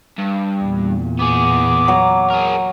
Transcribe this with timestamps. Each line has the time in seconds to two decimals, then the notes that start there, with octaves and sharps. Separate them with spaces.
0.18 G2
0.61 E2 A#2
1.20 B3 G#4 D6
1.88 F#3 A#5
2.30 G#4 A#4